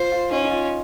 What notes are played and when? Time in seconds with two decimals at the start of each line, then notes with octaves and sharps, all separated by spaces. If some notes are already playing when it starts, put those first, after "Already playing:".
Already playing: F4 C5
0.12 F4
0.31 C#4 D#4
0.44 D#4
0.50 F4